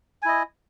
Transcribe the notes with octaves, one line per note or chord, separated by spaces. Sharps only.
E4 D#5 G#5